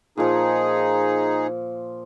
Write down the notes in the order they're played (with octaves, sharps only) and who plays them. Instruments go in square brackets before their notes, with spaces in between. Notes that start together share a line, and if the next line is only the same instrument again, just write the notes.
[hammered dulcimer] A#2 F3 [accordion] D#4 G#4